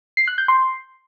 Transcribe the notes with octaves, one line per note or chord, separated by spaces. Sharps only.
C7
F#6
G6
C6